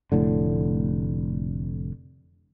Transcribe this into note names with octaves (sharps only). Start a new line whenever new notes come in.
F1 A2 D3